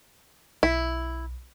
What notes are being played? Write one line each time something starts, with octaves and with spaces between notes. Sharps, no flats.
B1 E4